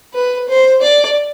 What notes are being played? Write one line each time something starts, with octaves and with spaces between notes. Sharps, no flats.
B4
C5
D5